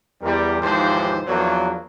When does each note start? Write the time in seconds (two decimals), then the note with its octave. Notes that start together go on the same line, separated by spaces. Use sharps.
0.21 E2 G3 A#4
0.60 D#2 G#2 E3 F3 G4 C5
1.27 E2 F3 F#3 A#3 B3 D4